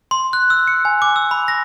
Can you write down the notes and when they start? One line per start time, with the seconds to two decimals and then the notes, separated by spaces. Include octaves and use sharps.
0.11 C6
0.33 F#6
0.50 E6
0.67 C#7
0.85 G#5
1.02 D6
1.16 E6
1.31 B5
1.48 A#6